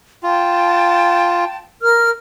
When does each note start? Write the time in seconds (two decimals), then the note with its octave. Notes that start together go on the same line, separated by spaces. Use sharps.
0.23 F4 G5 A5
1.81 A#4 F6